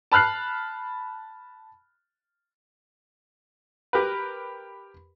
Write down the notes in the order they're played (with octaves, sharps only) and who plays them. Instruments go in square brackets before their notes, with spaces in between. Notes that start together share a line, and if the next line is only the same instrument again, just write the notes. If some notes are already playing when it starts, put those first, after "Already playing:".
[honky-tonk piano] A5 B5 F6 F#6 C7
[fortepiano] G4 A#4 B4